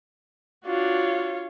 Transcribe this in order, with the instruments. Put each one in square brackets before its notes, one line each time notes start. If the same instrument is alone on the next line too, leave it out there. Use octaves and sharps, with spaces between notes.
[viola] D4 F#4 [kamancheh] F4 C#5